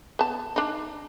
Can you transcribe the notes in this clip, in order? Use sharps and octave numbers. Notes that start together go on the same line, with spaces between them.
B3 A5
D4 D#4